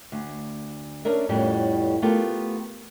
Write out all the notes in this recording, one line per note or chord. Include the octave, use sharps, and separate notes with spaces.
D2
C#4 D4 A#4 E5
F2 A2 G3 B3 C#4
A3 B3 F4 G4 G#4 A#4